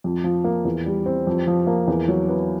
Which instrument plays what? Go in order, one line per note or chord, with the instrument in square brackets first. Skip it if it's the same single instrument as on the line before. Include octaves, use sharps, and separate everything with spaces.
[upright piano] F2
F3
A#3
E2
G3
C4
F2
F3
A#3
E2
F#3
B3